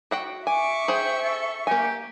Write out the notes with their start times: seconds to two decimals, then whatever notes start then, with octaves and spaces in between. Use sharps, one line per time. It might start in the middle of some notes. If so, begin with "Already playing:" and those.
0.11 F#4 F#5 G5
0.47 E5 G#5 C#6 D6
0.88 G#4 C5 G5
1.22 A4
1.67 A#3 G4 G#5